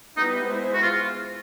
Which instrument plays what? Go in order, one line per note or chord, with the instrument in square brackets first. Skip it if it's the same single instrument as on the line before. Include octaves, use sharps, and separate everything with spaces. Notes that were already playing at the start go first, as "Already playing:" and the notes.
[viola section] G3 B3 E4 G4 B4 [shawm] D#4
[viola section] G#3 B3 E4 G#4 C5
[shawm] F#4
F4